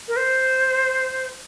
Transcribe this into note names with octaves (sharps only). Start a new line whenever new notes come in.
A#4
C5